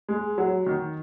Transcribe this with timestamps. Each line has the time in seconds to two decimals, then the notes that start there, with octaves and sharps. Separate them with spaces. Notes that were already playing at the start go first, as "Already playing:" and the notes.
0.09 G#3
0.38 F#3
0.66 D#3